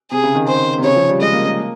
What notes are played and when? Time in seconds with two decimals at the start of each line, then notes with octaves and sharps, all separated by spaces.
0.11 C3 G#4
0.24 C#3
0.35 D#3
0.48 C5
0.78 C3
0.84 C#3 C#5
0.96 F3
1.09 G3
1.21 G#3 D#5
1.33 A#3
1.46 A#3